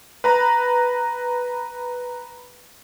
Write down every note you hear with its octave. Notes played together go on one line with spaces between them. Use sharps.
B4 A#5 B5